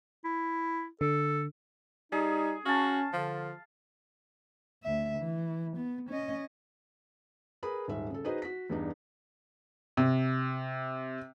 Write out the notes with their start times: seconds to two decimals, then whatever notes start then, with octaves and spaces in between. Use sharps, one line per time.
0.25 E4
1.01 D3 A4
2.12 G3 D#4 G#4
2.66 C#4 F#4 F5 A5
3.13 D3 F3
4.83 D2 E5
5.18 E3
5.77 B3
6.10 C#4 D#5
7.63 G#4 A#4 B4 B5
7.88 D#1 G#2 E5
8.10 C#3 A4
8.24 D#4 F#4 G#4 B4 C5 D#5
8.42 F#4 B6
8.70 E2 G2 D4 D#4
9.97 C3